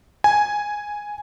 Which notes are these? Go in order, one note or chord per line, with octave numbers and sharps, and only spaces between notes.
G#5